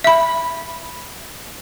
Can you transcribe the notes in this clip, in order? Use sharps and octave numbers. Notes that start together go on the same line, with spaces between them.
E5 B5